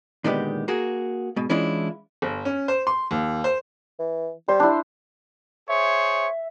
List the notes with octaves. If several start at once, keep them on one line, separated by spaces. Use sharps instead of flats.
A#2 D3 D#3 G#3 B3 G4
A#3 F#4 G#4
G#2 B2
E3 G#3 C#4 D4 E4 F4
G1
C#4
C5
C6
D#2
C5
E3
G3 C5
D4 E4
G#4 C5 C#5 E5